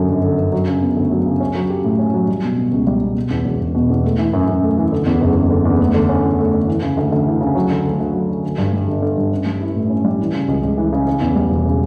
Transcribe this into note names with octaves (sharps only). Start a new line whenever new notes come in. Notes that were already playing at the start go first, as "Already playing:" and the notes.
Already playing: F#2 D3 F#3
G1
D3
F#2
F#3
C#3
B3
D2
F#3
C#3
C#4
F#3
G4
A2
C#4
F#3
G3
B2
B3
C#2
G3
B2
B2
E2
E1
E1
B2
E2
A3
E3
F#2
F#2
A3
E3
D3
E2
F#1
F#1
D3
E2
A3
D3
C#4
E2
A3
D3
E3
C#3
D2
D2
E3
C#3
F#3
D3
D2
D2
F#3
D3
D3
G2
G3
G1
D3
G2
C#4
G3
E4
A2
C#4
G3
E3
C#3
C#2
C#2
E3
C#3
C#3
E2
G3
E1
C#3